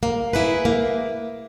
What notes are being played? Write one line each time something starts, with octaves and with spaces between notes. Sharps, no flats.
A#3
E4 G#4 B4
A#3